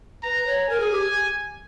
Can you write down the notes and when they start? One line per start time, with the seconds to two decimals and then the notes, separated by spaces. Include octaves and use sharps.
0.23 B4 A#5
0.47 C#5
0.68 A#4 G#5
0.80 G#4
0.91 G4